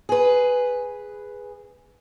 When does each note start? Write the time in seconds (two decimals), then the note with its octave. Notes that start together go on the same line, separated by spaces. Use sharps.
0.09 G#4 B4